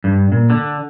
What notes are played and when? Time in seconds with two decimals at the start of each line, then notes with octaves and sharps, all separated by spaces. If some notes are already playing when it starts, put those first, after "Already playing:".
0.04 G2
0.32 A#2
0.50 D3